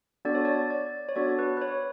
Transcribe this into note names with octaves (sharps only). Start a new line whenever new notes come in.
B3 D4 F#4 A4 D5
C#5
D5
D5
C#5
B3 D4 F#4 A4 D5
B4
B4
C#5